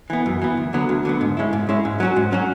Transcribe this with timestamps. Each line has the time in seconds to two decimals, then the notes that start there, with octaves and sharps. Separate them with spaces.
0.10 E3 B3
0.26 F#2
0.42 E3 B3
0.57 D2
0.73 D3 F#3 B3
0.89 D2
1.05 D3 F#3 B3
1.21 G#2
1.37 G#3 C#4 E4
1.53 G#2
1.69 G#3 C#4 E4
1.85 G#2
2.00 F#3 C#4 F#4
2.16 G#2
2.32 F#3 C#4 F#4